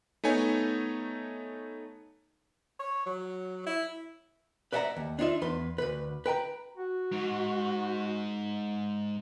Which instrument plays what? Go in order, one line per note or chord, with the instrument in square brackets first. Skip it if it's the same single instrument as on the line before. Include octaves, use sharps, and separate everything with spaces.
[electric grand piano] A3 B3 D#4 C#5 G#5
[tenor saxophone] C#5
F#3
E4
[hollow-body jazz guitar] B4 D5 E5 F#5 G#5 A#5
D#2
D4 D#4 F4 E5
E2 B4 C6
D2 B4
B4 G5 G#5 A#5
[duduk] F#4
[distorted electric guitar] G#2